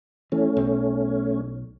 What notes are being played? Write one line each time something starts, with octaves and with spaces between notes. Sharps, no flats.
E3 A3 C#4
B1